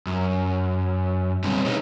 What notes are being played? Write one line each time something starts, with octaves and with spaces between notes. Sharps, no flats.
F#2
B2 D3 G3 C4 C#4
D#4 G4 G#4 B4 C#5 D#5